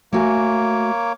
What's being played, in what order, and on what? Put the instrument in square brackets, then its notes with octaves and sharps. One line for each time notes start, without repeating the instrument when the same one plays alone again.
[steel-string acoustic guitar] A3 F#4 G#5 [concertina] A#3 C#5 D6